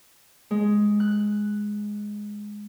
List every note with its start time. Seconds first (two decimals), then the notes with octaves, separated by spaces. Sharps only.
0.51 G#3
1.00 F#6